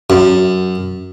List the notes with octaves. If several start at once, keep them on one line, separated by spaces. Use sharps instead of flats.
F#2